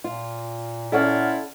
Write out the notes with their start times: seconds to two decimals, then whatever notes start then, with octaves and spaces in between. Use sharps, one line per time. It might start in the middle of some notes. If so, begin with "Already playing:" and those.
0.04 A#2 F4
0.92 C#4 E4 F4 A4 D5 F#5